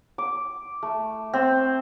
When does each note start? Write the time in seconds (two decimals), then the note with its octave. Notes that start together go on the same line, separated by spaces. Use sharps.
0.18 D6
0.83 A3
1.34 C4